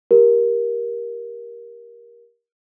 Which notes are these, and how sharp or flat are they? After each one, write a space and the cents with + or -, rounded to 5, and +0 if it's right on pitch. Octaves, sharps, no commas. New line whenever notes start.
G4 +0 A#4 +15